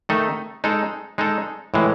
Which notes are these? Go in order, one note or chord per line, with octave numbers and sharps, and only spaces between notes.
D#3 A3 D#4 A4
G#3 D#4 A4
G#3 D#4 A4
A2 E3 G#3